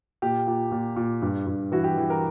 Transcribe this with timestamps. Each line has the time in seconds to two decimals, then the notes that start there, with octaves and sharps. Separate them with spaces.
0.22 A#2 G4
0.47 A#2
0.72 A#2
0.96 A#2
1.22 G2
1.47 G2
1.72 E3 F#4
1.84 G4
1.97 E3
2.10 A#4